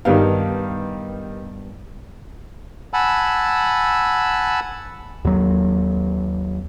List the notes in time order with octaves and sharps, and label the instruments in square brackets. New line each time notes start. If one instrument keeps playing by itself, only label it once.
[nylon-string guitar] G2 B3 [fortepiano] D#3 G3 F5
[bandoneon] F#5 G#5 A5 B5 E6
[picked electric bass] D#2 F#3